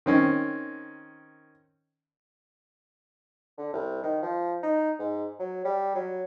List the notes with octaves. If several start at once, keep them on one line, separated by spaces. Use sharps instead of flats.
D#3 C4 C#4
D3
C2
D#3
F3
D#4
G#2
F#3
G3
F#3